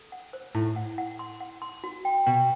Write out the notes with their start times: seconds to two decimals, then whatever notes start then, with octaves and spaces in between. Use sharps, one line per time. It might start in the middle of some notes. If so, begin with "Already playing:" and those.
Already playing: A4
0.12 F#5
0.33 C5
0.55 A2 E4
0.76 F#5
0.98 F#5
1.19 C6
1.41 F#5
1.62 C6
1.84 F#4
2.05 G5
2.26 B2 G5